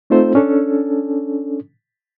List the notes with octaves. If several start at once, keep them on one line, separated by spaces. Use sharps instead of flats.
A3 C4 D#4 F4 A4 C5
C#4 D4 A4